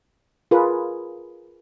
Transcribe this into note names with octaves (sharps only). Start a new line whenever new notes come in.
F4 G#4 A#4 B4